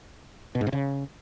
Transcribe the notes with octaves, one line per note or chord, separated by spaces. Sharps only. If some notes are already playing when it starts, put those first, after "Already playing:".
B2
G#2
C3
C#3